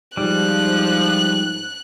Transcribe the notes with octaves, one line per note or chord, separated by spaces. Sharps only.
G#2 F3 G3 F#6